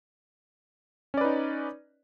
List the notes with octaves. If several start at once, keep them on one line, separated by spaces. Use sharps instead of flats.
C#4 D#4 B4 D5